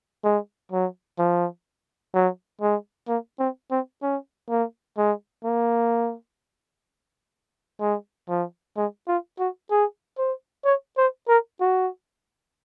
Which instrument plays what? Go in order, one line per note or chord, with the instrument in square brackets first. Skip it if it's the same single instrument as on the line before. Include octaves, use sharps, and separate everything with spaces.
[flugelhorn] G#3
F#3
F3
F#3
G#3
A#3
C4
C4
C#4
A#3
G#3
A#3
G#3
F3
G#3
F4
F#4
G#4
C5
C#5
C5
A#4
F#4